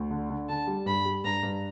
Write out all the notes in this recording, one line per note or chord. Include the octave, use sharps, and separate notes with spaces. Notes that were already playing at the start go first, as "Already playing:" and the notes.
Already playing: D2
D3
D3
D3 A5
G3
G2 B5
G3
G2 A#5
G2